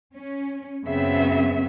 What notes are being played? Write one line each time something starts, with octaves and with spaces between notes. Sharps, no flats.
C#4
F#2 C#3 B3 C4 E5